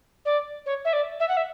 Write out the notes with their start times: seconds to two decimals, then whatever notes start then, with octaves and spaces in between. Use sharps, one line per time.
0.25 D5
0.66 C#5
0.85 E5
0.93 D5
1.20 E5
1.28 F#5
1.36 E5